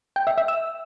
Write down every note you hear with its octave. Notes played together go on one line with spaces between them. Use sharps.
G5
E5
E5
E6